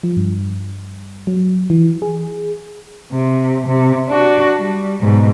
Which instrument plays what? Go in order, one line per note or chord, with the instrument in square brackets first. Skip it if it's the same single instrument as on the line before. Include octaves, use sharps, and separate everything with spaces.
[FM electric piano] F3
G2
F#3
E3
G#4
[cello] C3
C3
D4 F#4
G3
G#2 B2